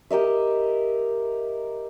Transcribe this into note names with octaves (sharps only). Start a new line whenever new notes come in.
G4 A#4 D#5 E5